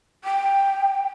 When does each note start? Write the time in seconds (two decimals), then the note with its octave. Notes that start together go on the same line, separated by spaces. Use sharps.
0.24 G5